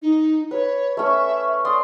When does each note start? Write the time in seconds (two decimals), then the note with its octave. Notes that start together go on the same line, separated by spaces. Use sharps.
0.02 D#4
0.51 B4 C#5
0.97 A3 C#4 E5
1.65 D5 C6 D#6